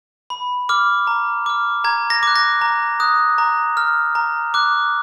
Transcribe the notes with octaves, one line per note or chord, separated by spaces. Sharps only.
B5
D6 F6
A#5
D6 F6
A#5 G#6
A#6
D6 F#6
A#6
A#5
D#6 F#6
A#5
F6
A#5
D6 F#6